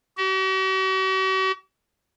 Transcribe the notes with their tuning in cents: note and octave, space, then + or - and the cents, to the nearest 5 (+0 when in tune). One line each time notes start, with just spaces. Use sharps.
F#4 +45